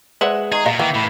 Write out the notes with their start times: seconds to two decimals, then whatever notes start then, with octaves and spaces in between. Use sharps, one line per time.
0.21 G#3 B4 C5 D5 E5 F#5
0.52 D#3 G#4 A#5
0.66 A#2 D#5 F5
0.79 D#3 E3 A#3 G5
0.95 A2 B5